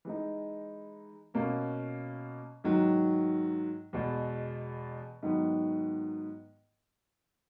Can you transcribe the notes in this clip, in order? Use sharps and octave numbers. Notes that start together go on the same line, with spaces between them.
E3 G#3 D#4
B2 A#3 C#4
G#2 D#3 F#3
E2 B2 G#3
G#2 D#3 F#3 B3